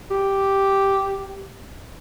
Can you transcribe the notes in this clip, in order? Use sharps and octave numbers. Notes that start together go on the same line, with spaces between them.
G4